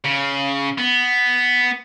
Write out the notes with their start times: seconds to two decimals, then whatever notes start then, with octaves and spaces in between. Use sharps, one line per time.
0.05 C#3
0.78 B3